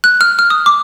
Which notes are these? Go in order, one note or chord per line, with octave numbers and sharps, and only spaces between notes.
F#6
F6
F6
D#6
D6